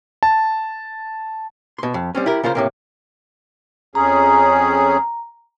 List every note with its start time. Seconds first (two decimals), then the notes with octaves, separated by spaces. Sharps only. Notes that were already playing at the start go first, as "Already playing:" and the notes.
0.23 A5
1.78 B2 C6
1.94 F2
2.15 G3 C4 C#4
2.26 E4 G4 A#4
2.44 C#3 F4 A#4 C5
2.55 A2 C3 A#3
3.95 F2 C#4 G#4 A#5